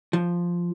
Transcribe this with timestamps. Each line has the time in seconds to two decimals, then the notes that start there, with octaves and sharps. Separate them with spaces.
0.13 F3